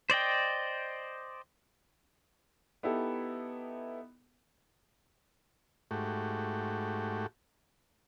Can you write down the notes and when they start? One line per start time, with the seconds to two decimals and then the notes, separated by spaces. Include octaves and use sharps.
0.10 C5 D5 D#5 G5
2.83 B3 D#4 E4 G4 A4
5.91 G#2 A3 F#4 G4